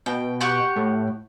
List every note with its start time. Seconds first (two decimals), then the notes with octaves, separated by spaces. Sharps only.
0.06 B2 G5
0.41 G4 F#5 C#6
0.76 A2